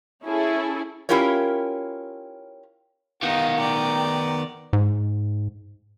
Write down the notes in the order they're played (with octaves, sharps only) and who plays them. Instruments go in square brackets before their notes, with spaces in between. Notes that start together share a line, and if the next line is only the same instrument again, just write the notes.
[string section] C#4 E4 G#4 A4
[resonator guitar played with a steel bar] C#4 E4 F4 G4 A#4 C#5
[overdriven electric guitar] D#3 B3 [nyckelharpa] D#4 [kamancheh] F5
[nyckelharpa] D5 [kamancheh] G5 A#5
[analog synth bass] G#2